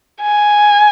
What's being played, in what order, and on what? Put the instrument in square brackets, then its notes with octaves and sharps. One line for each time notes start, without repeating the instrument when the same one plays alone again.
[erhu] G#5